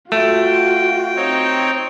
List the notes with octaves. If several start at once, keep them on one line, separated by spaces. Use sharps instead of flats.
A3 F4 F#4 G5
C4 D#4 C#5